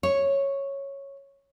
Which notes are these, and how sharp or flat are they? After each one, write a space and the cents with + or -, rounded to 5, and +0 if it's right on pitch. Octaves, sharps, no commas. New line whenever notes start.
C#5 -5